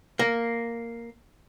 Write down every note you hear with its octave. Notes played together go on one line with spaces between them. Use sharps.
A#3